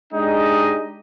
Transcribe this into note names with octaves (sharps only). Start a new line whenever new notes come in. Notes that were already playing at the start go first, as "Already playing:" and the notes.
G#3 D4 D#4 G4 D#5